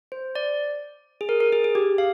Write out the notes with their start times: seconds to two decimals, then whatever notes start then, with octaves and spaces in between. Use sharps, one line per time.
0.12 C5
0.35 D5
1.21 G#4
1.29 A#4
1.41 A#4
1.53 G#4
1.64 G#4
1.75 G4
1.98 F5